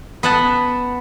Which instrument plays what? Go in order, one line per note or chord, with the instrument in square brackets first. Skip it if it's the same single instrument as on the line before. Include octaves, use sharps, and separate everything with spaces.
[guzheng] B3 F#5 A5